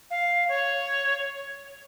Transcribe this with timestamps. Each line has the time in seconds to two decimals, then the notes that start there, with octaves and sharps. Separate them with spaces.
0.10 F5
0.49 C#5